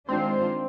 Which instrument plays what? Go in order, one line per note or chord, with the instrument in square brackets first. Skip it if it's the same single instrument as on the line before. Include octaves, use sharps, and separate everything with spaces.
[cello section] D#3 G#3 D4 F4 C5 [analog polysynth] C4